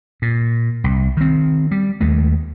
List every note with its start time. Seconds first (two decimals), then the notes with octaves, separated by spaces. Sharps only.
0.22 A#2
0.84 C2
1.17 D#3 C4
1.71 G3
2.01 D#2 G#3 A3